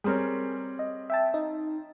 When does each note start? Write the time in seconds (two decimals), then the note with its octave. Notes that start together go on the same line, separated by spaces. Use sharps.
0.04 G3 C4 G#4 A#4 C#5
0.79 D#5
1.10 E5 G5 A5
1.34 D#4